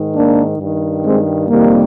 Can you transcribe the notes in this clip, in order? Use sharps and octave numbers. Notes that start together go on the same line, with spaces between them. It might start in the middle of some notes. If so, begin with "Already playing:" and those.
Already playing: G#2 D#3
A#3 D4
G2 D#3
G#3 C4
F2 C3 D#3 G3 A#3